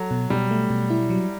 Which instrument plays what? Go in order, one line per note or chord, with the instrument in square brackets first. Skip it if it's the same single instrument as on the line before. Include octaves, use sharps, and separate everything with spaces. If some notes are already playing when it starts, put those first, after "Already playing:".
Already playing: [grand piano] F#3 [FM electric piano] A4
[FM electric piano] B2
[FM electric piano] B2 [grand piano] G3
[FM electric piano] A3
B2
E4
F#3